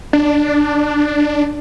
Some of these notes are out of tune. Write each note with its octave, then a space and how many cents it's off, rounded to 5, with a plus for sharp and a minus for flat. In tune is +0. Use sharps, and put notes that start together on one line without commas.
D4 +5